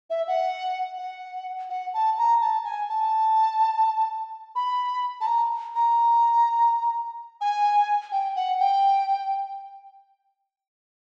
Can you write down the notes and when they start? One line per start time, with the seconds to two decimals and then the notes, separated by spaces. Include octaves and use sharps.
0.10 E5
0.27 F#5
0.98 F#5
1.70 F#5
1.94 A5
2.18 A#5
2.41 A5
2.65 G#5
2.89 A5
4.55 B5
5.21 A5
5.27 A#5
5.75 A#5
7.41 G#5
8.12 G5
8.36 F#5
8.60 G5